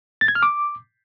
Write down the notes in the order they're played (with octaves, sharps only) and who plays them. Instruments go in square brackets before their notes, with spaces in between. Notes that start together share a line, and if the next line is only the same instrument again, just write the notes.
[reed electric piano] A6
G#6
F6
D6